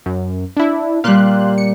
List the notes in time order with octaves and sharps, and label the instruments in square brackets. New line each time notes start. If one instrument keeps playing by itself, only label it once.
[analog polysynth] F#2
D4 E4
[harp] A#2 G3 [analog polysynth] F5 C6 F#6
[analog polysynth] C#7